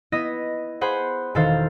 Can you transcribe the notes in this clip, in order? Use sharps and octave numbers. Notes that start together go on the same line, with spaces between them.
B3 E4 D#5 D#6 A#6 B6
G#4 C5 F#5 B5
E1 D#3 A4 C5 F5